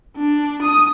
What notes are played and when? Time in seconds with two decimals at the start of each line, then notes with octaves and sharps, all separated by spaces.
0.17 D4
0.63 D#6